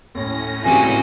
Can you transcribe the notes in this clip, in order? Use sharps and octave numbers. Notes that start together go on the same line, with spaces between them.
D#2 A2 C#4 A#6
C2 G#2 C#3 E3 F#4 G4 G#5